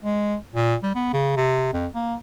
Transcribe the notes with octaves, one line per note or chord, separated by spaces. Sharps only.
G#3
A#2
G3
B3
C#3
C3
F2
A#3